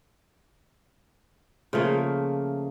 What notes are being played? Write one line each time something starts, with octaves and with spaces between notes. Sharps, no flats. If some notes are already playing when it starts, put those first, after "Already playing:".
C#3 F3 A3 A#3